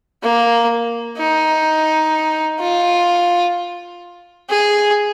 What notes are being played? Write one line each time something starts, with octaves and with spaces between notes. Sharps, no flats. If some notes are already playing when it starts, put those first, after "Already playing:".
A#3
D#4
F4
G#4